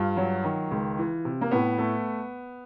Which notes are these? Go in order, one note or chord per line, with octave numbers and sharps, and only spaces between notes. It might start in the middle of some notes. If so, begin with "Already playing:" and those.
Already playing: G2 F4
F#3
D#3
C#2
E3
C3
A#3
A2 B3
A3